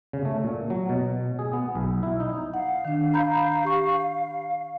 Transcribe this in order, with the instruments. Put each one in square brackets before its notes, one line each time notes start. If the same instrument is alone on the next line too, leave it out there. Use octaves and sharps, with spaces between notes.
[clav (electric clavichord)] C#3
A3
A#2
F#3
B2
G#4
B3
B1
E4
D#4
[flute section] F5 [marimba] F#5
[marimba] D#3 D4
A#5 B5 G6
G4 C#6